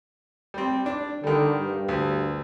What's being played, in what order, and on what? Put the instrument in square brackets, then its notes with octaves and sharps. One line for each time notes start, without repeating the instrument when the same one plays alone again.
[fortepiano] G3 C4
D4
[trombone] D3 [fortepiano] D#3 G3
[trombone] G2
[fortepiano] D2